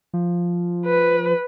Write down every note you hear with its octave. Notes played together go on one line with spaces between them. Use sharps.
F3
B4